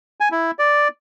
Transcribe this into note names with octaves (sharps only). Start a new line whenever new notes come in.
G#5
E4
D5